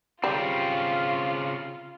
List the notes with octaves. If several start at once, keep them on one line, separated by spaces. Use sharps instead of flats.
C#3 G3 C4 F4